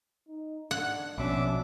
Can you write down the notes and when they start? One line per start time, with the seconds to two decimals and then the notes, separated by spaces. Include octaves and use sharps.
0.29 D#4
0.71 D4 F#5
1.18 A#1 B2 C#4 D4 E5 D6